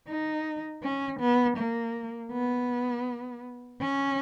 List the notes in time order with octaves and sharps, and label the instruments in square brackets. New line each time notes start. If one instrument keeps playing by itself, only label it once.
[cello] D#4
C#4
B3
A#3
B3
C#4